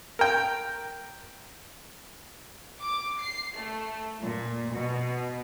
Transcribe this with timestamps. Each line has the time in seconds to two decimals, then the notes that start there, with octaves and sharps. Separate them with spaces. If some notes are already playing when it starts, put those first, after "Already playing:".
0.19 A#4 G5
2.82 D6
3.22 C7
3.57 A3
4.22 A#2
4.74 B2